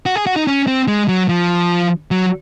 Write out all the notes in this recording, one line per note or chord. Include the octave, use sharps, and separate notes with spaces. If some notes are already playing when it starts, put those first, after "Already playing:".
F#4
G#4
F#4
D#4
C#4
C4
G#3
F#3
F3
F#3